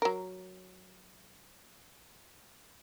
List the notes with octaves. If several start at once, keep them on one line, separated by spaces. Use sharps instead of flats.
F#3 A#4